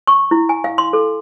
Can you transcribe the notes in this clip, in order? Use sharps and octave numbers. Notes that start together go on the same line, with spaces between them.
C#6
E4
G#5
F5
C6
A4